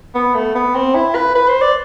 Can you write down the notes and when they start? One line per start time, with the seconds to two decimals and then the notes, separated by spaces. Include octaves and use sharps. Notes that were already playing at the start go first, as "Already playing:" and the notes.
0.15 B3
0.35 A3
0.55 B3
0.75 C4
0.95 E4
1.15 B4
1.35 B4
1.48 C5
1.62 D5